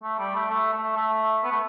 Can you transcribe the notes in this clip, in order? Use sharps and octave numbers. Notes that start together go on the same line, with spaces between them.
A3
G3
A3
A3
A3
A3
B3
A3